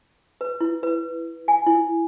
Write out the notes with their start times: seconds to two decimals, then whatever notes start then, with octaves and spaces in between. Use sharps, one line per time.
0.41 B4
0.60 E4
0.83 B4
1.48 G#5
1.66 E4